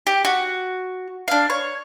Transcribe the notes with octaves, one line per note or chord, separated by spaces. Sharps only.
G4
F#4
D4 F5
C#5